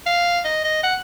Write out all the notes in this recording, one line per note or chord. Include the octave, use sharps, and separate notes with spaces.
F5
D#5
D#5
F#5